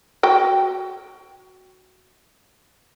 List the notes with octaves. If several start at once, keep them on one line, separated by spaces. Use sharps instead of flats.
F#4 G5